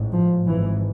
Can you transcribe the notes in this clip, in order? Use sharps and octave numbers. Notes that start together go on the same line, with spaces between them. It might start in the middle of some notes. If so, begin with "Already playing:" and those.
Already playing: A1 G#2
F3
G#1 G#2 E3